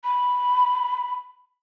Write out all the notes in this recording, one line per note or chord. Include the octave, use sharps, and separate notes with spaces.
B5